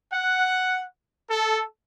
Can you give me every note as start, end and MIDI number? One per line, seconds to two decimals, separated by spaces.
0.13 0.84 78
1.30 1.63 69